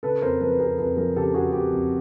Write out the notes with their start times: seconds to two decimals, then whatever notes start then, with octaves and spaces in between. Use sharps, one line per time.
0.03 C#3 A4 B4
0.22 F2 A#4 C5
0.41 F3 A4 B4
0.51 B4
0.59 F2 G#4 A#4
0.78 F2 A4 B4
0.97 F3 G#4 A#4
1.16 C#3 G4 A4
1.34 F2 F#4 G#4
1.53 F2 G4
1.72 F2